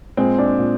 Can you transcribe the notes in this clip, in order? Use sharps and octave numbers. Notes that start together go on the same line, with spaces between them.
A#2 G#3 C4
D4
A#2